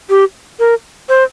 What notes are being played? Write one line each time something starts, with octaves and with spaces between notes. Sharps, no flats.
G4
A#4
C5